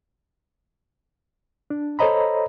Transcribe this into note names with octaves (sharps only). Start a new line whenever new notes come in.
D4
A4 C5 C#5 D#5 A#5 B5